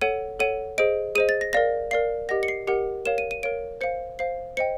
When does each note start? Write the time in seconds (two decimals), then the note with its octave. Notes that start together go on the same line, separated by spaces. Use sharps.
0.01 A4 C#5 F#5 D#7
0.40 A4 C#5 F#5 D#7
0.78 G#4 C5 D#5 D7
1.15 G#4 C5 D#5 D#7
1.29 A6
1.41 A#6
1.53 A#4 D5 F5 A#6
1.91 A#4 D5 F5 C7
2.29 G4 A#4 D#5 F#5 A#6
2.43 C#7
2.48 C7
2.67 G4 A#4 D#5 F#5 C#7
3.05 A#4 C#5 F5 E7
3.18 D#7
3.31 D#7
3.43 A#4 C#5 F5 D7
3.81 C5 F5 C#7
4.19 C5 F5 C7
4.57 C5 D#5 G5 C#7